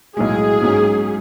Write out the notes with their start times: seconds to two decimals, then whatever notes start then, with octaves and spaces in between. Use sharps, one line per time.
0.16 B1 A2 G#3 G#4
0.62 G#2 F#3 C#4